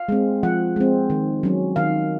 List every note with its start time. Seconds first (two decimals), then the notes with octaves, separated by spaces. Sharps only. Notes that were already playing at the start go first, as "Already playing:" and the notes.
Already playing: F5
0.09 G#3 C4
0.43 F3 F#5
0.76 G#3 C4
1.10 D#3
1.43 F#3 C#4
1.76 D#3 F5